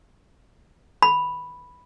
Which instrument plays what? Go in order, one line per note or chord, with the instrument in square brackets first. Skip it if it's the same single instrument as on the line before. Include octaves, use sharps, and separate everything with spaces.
[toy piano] B5